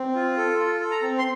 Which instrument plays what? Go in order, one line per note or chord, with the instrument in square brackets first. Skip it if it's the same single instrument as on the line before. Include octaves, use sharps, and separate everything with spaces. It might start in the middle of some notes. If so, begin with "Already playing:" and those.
Already playing: [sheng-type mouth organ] C4
F4
A4
F4
A4
A#5
C4
C6